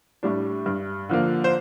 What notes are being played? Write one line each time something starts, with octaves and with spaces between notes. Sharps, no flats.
A2 G3 D4
G2
D3 F3 A#3
C5